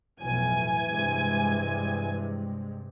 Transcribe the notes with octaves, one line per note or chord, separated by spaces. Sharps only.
B1 F2 A2 E3 G#5
G2 C3 G#3